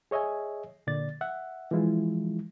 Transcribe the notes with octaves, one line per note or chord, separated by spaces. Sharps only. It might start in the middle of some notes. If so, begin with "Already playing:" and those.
G#4 C#5 D#5 E5 G#5
A#2 D3 D5 A6
E5 F#5
E3 F3 G#3 E4 F4